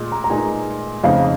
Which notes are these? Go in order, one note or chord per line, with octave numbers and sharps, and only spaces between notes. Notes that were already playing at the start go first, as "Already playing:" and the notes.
Already playing: A#2 G#3
A#5
A#5
A#2 G#3 D#4 G#5
F2 C#3 G#3 D#4 F5